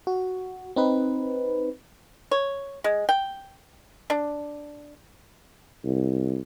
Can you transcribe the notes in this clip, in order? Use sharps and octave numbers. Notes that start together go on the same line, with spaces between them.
F#4
C4 D#4 B4
C#5
G#3
G5
D4
C2